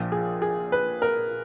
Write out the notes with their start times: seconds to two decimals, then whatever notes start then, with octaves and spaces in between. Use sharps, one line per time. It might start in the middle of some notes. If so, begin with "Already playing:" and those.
Already playing: A#1 A#2 F3
0.12 G#4
0.42 G#4
0.72 B4
1.02 A#4